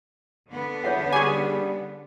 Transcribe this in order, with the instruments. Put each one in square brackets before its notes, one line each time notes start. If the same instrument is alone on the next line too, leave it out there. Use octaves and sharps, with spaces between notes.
[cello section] D3 B3 D4
[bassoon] E2 [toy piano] C#5 E5 F#5
[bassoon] G3 [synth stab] G#4 G#5 [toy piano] C#6 D6